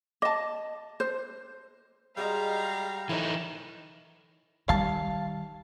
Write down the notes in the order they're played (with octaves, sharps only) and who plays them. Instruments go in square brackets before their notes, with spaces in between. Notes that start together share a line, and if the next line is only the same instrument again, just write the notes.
[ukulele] D#5 A5 [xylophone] D6
[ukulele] C5
[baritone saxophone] G3 [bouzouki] G#3 F#4 D#5 [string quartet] F5 A#5
[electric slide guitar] E3 D#4 [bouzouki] A3 C#5 G5
[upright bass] D#3 G3 [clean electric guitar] F5 A5